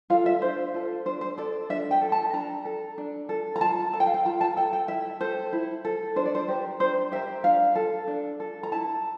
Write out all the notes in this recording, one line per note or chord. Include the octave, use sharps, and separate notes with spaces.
F4 A4 F5
E5
D4 C5
F4 A4
D4 C5
C5
A4 D5
D4 E5
G5
A4
A5
D4 A#5
A4
D4
A4
A#5
F4 A5
A4 A5
G5
F5
G5
F4 A#5
A5
A4 G5
G5
E4 E5
A4 C5
E4
A4
D4 C5
D5
C5
G4 A#4 C5
D4 C5
G4 A#4 E5
D4 F5
A4
D4
A4
A#5
E4 A5